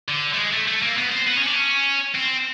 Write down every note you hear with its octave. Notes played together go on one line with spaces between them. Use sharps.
D3
A3
G#3
A3
A3
A#3
B3
C4
B3
C#4
D4
C#4
C4